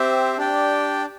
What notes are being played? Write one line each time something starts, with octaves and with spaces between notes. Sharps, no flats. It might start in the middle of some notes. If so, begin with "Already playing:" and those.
Already playing: C4 G4 C5 E5
D4 G4 D5 G5